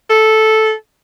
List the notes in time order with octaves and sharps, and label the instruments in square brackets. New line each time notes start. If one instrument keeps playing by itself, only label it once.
[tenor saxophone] A4